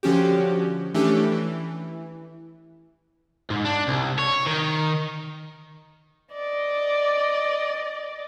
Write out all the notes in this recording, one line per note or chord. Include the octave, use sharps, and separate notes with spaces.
D3 F3 C#4 F#4 G4
E3 A3 C#4 D4 G4 A4
E3
G#2
D4
C2
C#5
D#3
D5 D#5